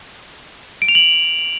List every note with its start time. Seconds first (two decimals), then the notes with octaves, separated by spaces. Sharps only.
0.82 D7
0.88 F7
0.95 F#7